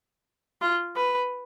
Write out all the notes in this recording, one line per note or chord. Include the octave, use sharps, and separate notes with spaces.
F4
B4